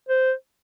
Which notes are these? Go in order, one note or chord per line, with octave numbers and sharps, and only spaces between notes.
C5